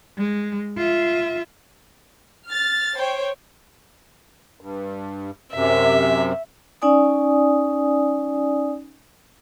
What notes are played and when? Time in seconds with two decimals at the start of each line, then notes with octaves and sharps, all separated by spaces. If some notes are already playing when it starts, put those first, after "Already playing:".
0.17 G#3
0.77 F4 E5
2.46 F6 A6
2.97 C5 C#5 G5
4.61 G2
5.54 F#2 C3 E5
6.82 C#4 D#4 D5 G#5 D#6